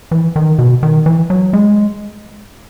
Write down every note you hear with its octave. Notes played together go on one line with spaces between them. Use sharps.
E3
D#3
B2
D#3
E3
F#3
G#3